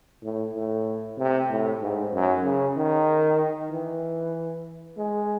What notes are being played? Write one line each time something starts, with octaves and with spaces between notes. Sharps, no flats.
A2
A2
C3
A2
G#2
F#2
C#3
D#3
E3
G#3